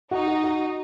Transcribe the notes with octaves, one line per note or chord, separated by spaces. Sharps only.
D#4 F#4
F#4
F#4